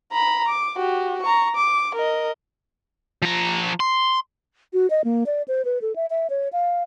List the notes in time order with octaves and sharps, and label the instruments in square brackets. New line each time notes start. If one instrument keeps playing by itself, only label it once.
[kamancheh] A#5 B5
D6
F#4 G4
A#5 C#6
D6
A#4 D#5
[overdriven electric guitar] F3 A#5
C6
[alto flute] F#4
D#5
A#3
D5
C5
B4
A4
E5
E5
C#5
F5